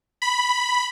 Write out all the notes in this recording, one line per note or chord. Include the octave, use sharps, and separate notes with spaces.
B5